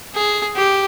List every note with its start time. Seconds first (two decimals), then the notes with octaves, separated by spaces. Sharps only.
0.15 G#4
0.56 G4